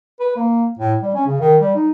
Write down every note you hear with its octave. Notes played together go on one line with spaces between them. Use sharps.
B4
A#3
A2
G3
C#4
C#3
D#3
G3
D#4